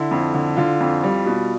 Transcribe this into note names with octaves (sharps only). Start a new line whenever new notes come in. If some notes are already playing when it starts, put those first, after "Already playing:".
Already playing: D3 E4
F2
D3
D3 F4
F2
G3
B2